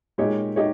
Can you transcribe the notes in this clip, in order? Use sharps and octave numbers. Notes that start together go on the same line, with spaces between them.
A#2 G#3 D#4 G4 C#5
D#4 G4 C#5